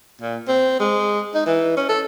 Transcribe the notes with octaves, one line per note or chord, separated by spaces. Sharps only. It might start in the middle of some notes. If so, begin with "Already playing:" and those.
A#2
C4
G#3
D#4
E3
C#4
A4